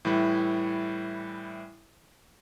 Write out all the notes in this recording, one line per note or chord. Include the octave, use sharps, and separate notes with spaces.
A2 E3 G3 E4